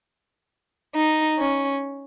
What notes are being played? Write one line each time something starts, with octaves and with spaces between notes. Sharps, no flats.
D#4
C#4